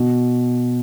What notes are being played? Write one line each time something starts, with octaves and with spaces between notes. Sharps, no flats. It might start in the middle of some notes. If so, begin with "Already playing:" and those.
Already playing: B2